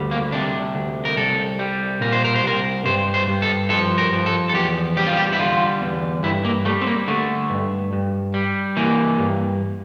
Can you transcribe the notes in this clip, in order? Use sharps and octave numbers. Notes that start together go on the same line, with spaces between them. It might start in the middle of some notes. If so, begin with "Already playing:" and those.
Already playing: D2 G3
A#3
C3 D4
D2
A#4
C2 A4
G3
A#2 A#4
C5
A#4
C5
C2 A#4
G2 C5
C5
G2
A4
F3 A4
A#4
F3
A4
A4
E2 G4
G3 G4
F4
G4
E4
D3 F4
E2
G2 E4
A#3
G3 A3
C4
A#3
D3 A3
G2
G2
G3
E3 A#3
G2